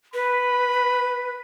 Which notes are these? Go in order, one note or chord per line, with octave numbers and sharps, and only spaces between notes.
B4 B5